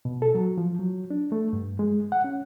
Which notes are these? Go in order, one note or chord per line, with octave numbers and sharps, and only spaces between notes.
B2
A4
F#3
F3
F#3
D4
A3
G2
G#3
F#5
C#4